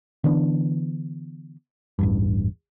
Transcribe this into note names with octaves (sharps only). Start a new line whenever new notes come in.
D3 E3 B3 D4
A1 E2 G2